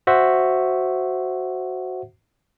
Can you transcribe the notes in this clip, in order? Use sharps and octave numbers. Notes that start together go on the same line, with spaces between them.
F#4 C5 E5 F#5